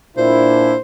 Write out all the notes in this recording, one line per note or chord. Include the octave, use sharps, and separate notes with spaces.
A#2 D4 E4 C5